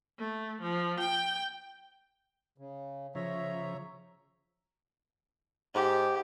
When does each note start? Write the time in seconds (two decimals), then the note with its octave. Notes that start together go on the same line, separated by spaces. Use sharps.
0.19 A3
0.62 F3
1.00 G5
2.58 C#3
3.15 C#3 F3 C#5 E5 A#5
5.75 G#2 G4